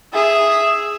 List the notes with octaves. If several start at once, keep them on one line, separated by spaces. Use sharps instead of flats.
G#4 E5